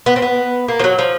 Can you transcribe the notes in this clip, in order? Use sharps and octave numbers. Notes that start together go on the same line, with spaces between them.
B3
C4
B3
A#3
F3
F#3
F3